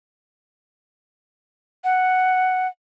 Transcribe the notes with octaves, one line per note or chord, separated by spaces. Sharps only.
F#5